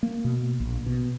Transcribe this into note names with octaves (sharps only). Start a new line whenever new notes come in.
A#3
B2
A#1
B2